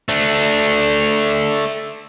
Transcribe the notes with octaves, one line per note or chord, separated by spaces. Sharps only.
A3 D4